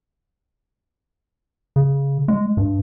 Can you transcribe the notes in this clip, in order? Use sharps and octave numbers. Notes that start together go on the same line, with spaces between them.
C#3
G#3
G2